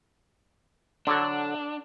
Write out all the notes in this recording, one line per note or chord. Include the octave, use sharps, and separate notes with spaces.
D3 F#3 D4 A4